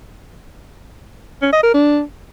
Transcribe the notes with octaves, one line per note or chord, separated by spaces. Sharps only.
C#4
D#5
A#4
D4